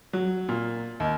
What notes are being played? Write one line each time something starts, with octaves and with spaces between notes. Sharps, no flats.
F#3
A#2
D#2